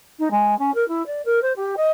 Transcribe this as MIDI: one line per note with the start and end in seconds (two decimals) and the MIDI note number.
0.19 0.28 63
0.31 0.57 56
0.58 0.73 61
0.74 0.87 70
0.88 1.05 64
1.06 1.21 74
1.25 1.40 70
1.42 1.52 72
1.56 1.74 67
1.77 1.91 75